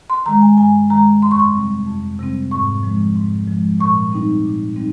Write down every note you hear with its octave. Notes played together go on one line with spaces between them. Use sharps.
C6
D#3 G#3 A#5
G#5
G2 G#5
D#3 G#3 A#5
F2 C6
C#6
C6
C3 G3 C4
F2
C3 G3 C4
G#2 C#6
F3 G#3
G#2
F3 G#3
A#2 C#6
G3 C4 D#4
A#2
G3 C4 D#4